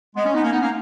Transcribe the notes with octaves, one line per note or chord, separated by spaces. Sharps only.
G#3 B3
C#4
B3 D#4
A#3 C#4
B3 D#4
A#3 C#4